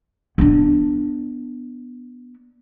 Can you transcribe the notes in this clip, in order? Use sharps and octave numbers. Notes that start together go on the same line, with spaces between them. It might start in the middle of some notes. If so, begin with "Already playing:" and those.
B3 D4